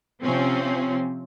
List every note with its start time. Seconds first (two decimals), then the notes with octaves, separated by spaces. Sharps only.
0.23 C3 F3 C4 C#4